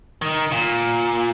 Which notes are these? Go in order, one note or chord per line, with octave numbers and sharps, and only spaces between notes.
D#3
A#2